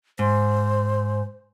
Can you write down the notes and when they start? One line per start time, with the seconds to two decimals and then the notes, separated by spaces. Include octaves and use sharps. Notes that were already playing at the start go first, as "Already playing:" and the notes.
0.19 G#2 C5